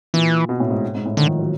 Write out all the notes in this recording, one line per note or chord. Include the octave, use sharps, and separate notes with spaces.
A#2 E3
B2
A2
G#2
G#2
A2
D3 D#3
F3
F#3